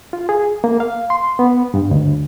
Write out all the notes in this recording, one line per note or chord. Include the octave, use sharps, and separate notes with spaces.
F4
G#4
A#3
F5
C6
B3
G2
D2